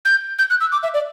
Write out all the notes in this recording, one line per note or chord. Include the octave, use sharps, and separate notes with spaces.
G6
G6
F#6
E6
D6
E5
D5